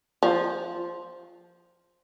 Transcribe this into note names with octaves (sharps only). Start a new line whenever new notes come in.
F3